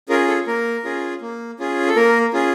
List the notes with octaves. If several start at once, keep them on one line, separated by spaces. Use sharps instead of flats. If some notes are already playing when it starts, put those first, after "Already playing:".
C#4 F4 G#4 A#4
A4
A#3 A#4
C#4 F4 G#4
A#3
C#4 F4 G#4
A4
A#3 A#4
C#4 F4 G#4